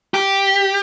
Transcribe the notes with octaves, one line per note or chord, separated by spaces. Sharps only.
G4